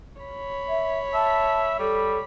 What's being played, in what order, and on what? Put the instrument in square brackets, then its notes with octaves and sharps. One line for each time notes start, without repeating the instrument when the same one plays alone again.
[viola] C#5 B5
[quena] E5
[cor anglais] E5 [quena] A5
[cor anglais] G3 [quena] A4